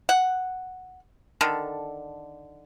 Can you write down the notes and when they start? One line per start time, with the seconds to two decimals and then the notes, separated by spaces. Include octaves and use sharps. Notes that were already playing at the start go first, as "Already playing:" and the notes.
0.09 F#5
1.41 D3 D#3 A4